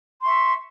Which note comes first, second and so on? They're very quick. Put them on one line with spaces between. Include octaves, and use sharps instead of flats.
C6 C#6 E5